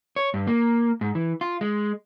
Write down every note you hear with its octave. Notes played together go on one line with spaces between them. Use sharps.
C#5
G2
A#3
G#2
E3
F4
G#3